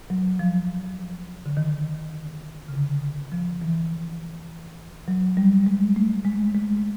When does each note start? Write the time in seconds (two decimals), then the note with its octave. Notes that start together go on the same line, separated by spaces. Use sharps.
0.10 F#3
0.39 F3
1.46 D3
1.57 D#3
2.68 C#3
2.74 D3
3.32 F3
3.62 E3
5.08 F#3
5.37 G3
5.66 G#3
5.96 A3
6.25 G#3
6.54 G#3